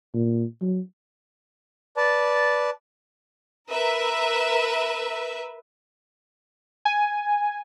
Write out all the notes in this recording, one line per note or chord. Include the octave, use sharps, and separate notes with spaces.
A#2
F#3
B4 D5 A5
A#4 B4 E5
G#5